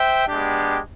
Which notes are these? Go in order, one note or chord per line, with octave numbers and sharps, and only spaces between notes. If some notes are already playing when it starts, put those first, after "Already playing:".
Already playing: C5 E5 G5
G#3 B3 D4 G4